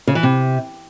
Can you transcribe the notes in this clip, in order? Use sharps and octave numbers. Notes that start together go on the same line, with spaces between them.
C#3
E3
C3